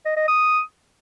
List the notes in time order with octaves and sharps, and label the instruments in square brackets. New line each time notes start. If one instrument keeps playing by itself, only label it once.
[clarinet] D#5
D#5
D#6